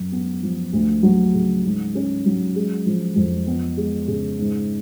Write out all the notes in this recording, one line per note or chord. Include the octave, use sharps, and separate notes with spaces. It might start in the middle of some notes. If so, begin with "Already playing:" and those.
Already playing: F#2
B3
F3
D2
F#3
C#3
G#2
C#4
F#3
G#3
F3
F2
B3
G#3
C#3
G#2